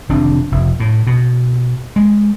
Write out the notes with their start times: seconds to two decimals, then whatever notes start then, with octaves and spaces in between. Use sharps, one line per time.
0.09 F1 D#3 C4 D4
0.52 F1
0.80 A2
1.07 B2
1.96 G#3